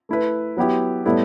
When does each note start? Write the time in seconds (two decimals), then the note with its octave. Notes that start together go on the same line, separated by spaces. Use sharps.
0.09 A3 E4 B4
0.57 F#3 B3 E4 G4
1.05 A2 G3 B3 E4 A4